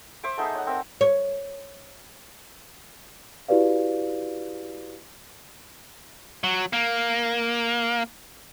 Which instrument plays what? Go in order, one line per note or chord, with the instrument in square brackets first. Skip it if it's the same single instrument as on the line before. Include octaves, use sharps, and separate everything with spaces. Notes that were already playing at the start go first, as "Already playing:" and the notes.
[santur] C5 E5 C#6 D6
A3 B3 D#4 G#4
C#5 F#5
C4 A#4 E5
[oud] C#5
[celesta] E4 F#4 G4 B4 D5 F5
[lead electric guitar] F#3
A#3